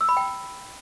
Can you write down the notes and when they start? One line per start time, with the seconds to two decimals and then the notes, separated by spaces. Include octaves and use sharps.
0.01 E6
0.09 B5
0.17 G5